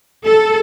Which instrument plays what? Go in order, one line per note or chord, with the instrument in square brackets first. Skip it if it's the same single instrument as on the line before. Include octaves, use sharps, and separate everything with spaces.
[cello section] A4